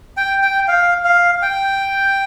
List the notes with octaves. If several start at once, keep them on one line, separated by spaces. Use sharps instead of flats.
G5
G5
F5
F5
G5